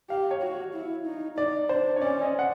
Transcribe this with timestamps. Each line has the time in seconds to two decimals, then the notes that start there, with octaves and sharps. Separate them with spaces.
0.10 G4 F5
0.31 C#5
0.42 F#4
0.74 E4
1.06 D#4
1.38 D#4 D5
1.69 D4 C5
1.96 C#5
2.02 C#4 D5
2.23 D#5
2.39 F#5